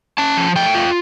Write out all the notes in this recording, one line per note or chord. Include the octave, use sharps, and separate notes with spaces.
C#4 A5
F3
A3 G5
F4